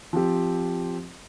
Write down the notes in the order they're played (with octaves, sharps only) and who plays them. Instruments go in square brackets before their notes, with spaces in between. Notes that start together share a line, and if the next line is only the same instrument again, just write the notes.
[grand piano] F3 C4 G4